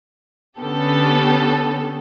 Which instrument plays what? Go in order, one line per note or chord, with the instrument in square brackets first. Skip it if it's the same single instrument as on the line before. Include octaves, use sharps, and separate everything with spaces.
[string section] D3 B3 C#4 G4 A4